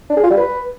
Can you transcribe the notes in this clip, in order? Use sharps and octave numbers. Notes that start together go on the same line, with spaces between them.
D4
G#4
F4
G3
B4